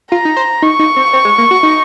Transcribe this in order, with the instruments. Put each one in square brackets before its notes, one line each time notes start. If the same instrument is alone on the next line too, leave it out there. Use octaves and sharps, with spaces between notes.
[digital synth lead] F4 [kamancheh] A#5
[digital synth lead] D#4
C5
[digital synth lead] D#4 [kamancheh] C#6
[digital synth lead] D#4
C4
C4
G#3
A#3
F#4
D#4